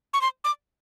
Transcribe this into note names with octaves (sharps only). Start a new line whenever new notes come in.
C#6
C6
D6